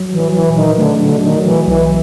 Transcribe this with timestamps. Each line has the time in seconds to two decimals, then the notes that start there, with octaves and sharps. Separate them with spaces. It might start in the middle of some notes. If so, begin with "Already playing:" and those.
Already playing: F#3
0.12 E3
0.19 F#3
0.34 E3
0.49 A#2
0.56 D#3
0.78 D3 A3
1.01 D3
1.08 F#3
1.24 D#3
1.38 F#3
1.45 E3
1.67 B1 E3